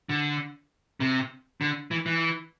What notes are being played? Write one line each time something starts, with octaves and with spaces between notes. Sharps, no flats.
D3
C3
D3
E3
E3